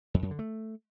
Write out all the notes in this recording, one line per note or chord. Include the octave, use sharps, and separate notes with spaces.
F2
F#2
D3
A3